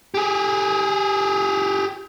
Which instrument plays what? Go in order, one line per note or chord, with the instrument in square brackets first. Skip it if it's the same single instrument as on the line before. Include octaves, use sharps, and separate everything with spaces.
[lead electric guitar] G4 G#4